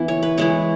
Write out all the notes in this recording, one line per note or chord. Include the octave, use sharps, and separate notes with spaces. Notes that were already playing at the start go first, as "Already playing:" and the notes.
Already playing: E3 B3 E4 E5
C#5
B4
E3 G#3 E4 C#5